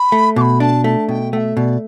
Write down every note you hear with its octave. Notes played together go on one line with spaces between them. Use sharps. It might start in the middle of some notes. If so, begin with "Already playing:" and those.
Already playing: B5
A3
B2 B5 D6
D4 A5
A3 A5
B2 G5
A3 E5 G5
B2 D5